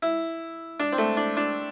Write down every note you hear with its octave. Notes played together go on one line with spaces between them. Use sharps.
E4
D4
C4
A3
D4
D4